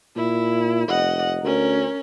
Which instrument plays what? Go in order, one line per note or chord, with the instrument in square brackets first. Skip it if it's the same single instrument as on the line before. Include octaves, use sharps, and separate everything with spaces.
[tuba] A#2 [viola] E4
[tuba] F1 [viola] D#5 F#5
[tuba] D2 [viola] C#4 A#4